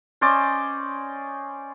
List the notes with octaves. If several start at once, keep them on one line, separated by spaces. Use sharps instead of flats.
C#4 C5 D5 D#5